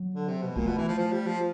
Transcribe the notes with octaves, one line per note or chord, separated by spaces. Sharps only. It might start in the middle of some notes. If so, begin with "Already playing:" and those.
Already playing: F#3
D3
C3
B2
A#2 A3
B2
E3
F3
F3
G3
F3